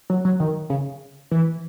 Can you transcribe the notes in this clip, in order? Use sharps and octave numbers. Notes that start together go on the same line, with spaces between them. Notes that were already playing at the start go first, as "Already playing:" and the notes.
F#3
F#3
D#3
C#3
E3